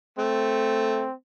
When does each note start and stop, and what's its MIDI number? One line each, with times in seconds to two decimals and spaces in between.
0.19 1.05 57
0.19 1.14 60